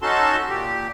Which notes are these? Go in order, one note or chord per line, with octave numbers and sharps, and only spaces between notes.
C#4 D#4 F#4 A4 A5 C6
A#2 G4